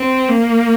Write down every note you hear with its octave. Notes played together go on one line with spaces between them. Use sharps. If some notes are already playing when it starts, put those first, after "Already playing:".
Already playing: C4
A#3